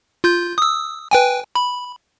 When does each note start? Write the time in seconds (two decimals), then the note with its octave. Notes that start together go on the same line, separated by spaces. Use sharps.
0.24 F4 G6
0.58 D#6 E6
1.11 B4 G5 G#5
1.55 B5